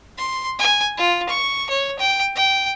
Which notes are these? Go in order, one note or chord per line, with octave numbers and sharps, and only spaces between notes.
C6
G#5
F4
C#6
C#5
G5
G5